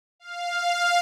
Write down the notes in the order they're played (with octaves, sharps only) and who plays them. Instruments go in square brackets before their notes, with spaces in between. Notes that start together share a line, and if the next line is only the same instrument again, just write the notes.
[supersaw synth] F5